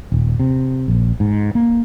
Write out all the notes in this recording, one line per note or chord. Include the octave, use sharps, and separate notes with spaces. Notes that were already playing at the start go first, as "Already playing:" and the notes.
D#1
C3
A#1
G#2
A#3